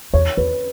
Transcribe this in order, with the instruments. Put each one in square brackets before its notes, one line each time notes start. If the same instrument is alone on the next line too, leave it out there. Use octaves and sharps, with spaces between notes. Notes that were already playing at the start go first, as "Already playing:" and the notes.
[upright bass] E2 [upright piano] C#5
[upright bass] E2 [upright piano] B4